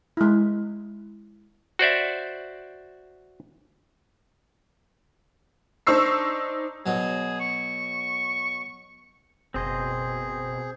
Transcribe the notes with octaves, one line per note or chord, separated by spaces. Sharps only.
G#3 E4
F#4 C5 D5 E5
D4 D#4 C5 C#6 E6 C7
B2 F#3 G#4
C#6
F#1 B2 C4 G#4 C5 D#5